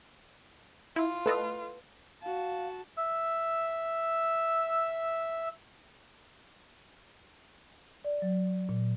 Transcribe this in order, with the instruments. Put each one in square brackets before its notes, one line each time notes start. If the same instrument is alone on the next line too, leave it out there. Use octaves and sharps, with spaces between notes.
[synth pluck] E4 [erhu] F4
[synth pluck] A3 A4 D#5 [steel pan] B4
[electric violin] F#4 A5 [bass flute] F5
[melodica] E5 E6
[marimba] D5
F#3
A#2